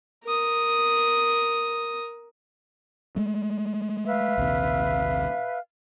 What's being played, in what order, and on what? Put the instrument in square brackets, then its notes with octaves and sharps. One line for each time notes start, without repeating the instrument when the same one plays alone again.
[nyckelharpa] A#4 D#6
[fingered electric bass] G#3 A3
[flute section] B4 E5 F5
[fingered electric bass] A#1 D#2 C3